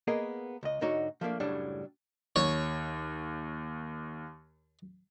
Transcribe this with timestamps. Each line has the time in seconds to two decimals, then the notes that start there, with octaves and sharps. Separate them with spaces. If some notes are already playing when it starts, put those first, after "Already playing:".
0.07 A#3 B3 G#4 A#4 D#5 F5
0.63 C#2 D#5
0.81 G#2 D3 D#4 F#4 C#5
1.21 F3 A3 A#3 D4
1.40 F#2 A2 C#3 F#3 G3 D4
2.36 D#2 C#5